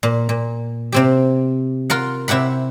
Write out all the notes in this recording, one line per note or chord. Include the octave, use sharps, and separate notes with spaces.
A#2
A#2
C3 C4 G4
F4 A#4 F#5
C3 E4 G4 F#5 B5